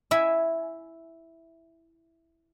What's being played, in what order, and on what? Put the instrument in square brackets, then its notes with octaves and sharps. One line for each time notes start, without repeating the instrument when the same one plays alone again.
[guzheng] E4 E5 G#5